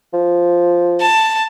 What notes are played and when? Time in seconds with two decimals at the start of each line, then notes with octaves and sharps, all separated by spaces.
0.14 F3
1.01 A5